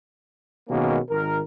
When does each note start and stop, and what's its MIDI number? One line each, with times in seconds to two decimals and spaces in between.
0.69 0.98 47
0.69 0.98 51
0.69 0.98 56
0.69 0.98 58
0.69 0.98 61
1.09 1.39 32
1.09 1.39 70